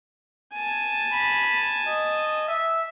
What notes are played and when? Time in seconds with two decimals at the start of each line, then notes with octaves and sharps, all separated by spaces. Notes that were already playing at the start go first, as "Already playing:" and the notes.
0.54 G#5 A5
1.12 B5
1.87 D#5
2.48 E5